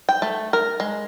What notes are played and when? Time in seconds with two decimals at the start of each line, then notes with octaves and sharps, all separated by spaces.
0.09 G5
0.22 A3
0.53 A#4
0.80 G#3